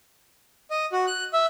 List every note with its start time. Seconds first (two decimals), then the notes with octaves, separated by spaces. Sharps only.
0.71 D#5
0.92 F#4
1.07 F#6
1.33 E5